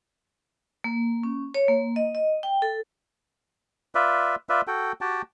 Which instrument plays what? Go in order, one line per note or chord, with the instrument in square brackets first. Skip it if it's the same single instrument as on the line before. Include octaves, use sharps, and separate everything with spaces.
[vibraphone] A#3
C#4
C#5
A#3
D#5
D#5
G5
A4
[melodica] F4 B4 D5 E5
F4 B4 D5 E5
F#4 A4 G5
F#4 G4 G5 A5